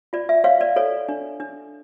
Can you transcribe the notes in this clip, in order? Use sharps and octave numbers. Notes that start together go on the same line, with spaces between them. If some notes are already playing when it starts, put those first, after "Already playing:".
F4 D5
E5
C#5 F5
D5
A4 C#5
D4
D4